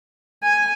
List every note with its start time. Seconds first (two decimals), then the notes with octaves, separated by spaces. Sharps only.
0.44 G#5